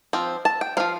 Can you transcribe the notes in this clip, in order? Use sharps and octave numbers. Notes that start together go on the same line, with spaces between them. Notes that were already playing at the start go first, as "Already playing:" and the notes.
F3 C4
A5
G5
F3 C4 F5